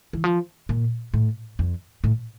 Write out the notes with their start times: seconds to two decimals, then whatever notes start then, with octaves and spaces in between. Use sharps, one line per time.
0.13 E3
0.24 F3
0.69 A#2
1.14 A2
1.59 F2
2.04 A2